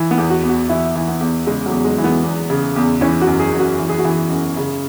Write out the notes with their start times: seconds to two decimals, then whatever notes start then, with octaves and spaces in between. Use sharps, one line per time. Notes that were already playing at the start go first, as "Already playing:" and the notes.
Already playing: E3
0.11 B3
0.18 E2
0.30 F#4
0.43 E2
0.49 F#4
0.69 E3 E4
0.95 E3
1.08 B3
1.21 E2
1.47 C#3 G#3
1.66 F#3
1.72 E2
1.85 G#3
1.98 E3
2.04 B3
2.23 E2
2.50 C#3
2.76 E2
3.01 E3 C#4
3.21 F#4
3.27 F#2
3.40 G#4
3.54 F#2
3.59 F#4
3.79 E3
3.89 G#4
3.99 F#4
4.05 E3 G#4
4.30 F#2
4.57 C#3